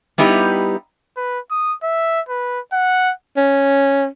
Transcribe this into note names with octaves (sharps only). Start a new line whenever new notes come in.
G3 B3 D#4 E4 G4
B4
D#6
E5
B4
F#5
C#4